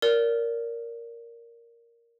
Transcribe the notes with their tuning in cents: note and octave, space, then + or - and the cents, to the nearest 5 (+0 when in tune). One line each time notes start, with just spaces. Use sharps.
A#4 +0 D5 -25